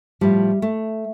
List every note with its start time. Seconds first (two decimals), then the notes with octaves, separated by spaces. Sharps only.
0.21 A2 F3 G3
0.62 A3